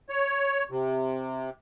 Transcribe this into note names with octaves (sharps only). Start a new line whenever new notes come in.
C#5
C3